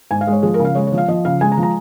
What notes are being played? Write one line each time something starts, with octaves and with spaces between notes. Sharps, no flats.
G#2 G#5
F5
G#3
C#5
F3 G#4
A#4
C#3
F5
G#3 C#5
C#5
F3
F5
F3 D#5
C#3 F5
G#3 G#5
A#5
F3
A#5